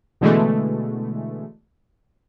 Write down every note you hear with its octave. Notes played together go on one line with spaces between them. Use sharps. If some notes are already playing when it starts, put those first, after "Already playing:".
B2 D3 E3 G#3 A3